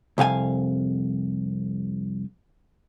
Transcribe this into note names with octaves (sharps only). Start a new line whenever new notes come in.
C2 F2 F5 G#5